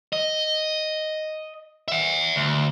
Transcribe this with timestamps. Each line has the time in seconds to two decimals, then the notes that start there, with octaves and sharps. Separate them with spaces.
0.13 D#5
1.88 E5 F#5
2.36 D2